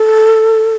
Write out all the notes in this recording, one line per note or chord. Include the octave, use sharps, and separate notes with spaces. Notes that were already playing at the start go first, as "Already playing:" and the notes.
Already playing: A4